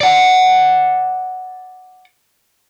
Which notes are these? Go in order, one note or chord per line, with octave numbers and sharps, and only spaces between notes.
D5 F#5